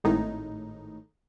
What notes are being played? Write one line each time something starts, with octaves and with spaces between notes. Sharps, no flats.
G#1 A2 D#4